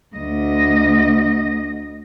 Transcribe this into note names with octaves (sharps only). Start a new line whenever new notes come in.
D2 D#5